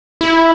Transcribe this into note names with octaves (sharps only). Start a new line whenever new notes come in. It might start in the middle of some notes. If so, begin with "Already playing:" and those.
E4